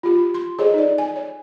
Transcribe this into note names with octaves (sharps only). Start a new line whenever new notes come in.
F4 G4
C6
G#4 A4 C5 C#5 D#5
D#4 D5
G#5
C#5